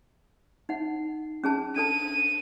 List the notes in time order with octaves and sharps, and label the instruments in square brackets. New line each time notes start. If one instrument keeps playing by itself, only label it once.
[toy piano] D#4 F#5
C#4 G#4 A5
[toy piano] D4 A4 A5 [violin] D#7